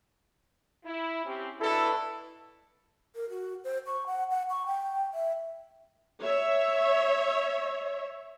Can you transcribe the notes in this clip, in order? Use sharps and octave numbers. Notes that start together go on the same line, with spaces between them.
E4
C4 C#4 G4
B2 D4 E4 A4 B4
A#4
F#4
C5
C#6
F#5
F#5
C#6
G5
E5
C#5 E5